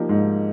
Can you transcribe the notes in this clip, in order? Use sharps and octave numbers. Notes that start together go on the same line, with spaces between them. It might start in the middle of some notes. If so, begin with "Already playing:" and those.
Already playing: F3 A#3 D#4 G4
G#2